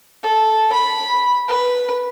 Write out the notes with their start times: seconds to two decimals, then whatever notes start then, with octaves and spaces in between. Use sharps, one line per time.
0.23 A4
0.73 B5
1.48 B4